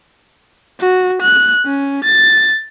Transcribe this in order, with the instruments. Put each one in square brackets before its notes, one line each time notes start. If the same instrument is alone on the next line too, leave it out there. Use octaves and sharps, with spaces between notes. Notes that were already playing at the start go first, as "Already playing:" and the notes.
[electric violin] F#4
F#6
C#4
A6